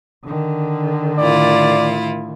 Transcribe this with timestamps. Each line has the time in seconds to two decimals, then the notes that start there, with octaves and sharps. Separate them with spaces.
0.24 D3 D#3
1.18 A2 E4 F4 D5